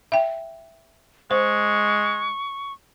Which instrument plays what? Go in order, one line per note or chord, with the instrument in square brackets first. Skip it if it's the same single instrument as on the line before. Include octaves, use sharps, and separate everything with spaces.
[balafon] E5 G5
[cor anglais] G#3 [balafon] C5 [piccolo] C#6